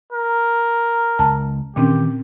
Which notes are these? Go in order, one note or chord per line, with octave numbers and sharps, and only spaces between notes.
A#4
C#2 A5
A#2 D#3 E3 C4 C#4 G4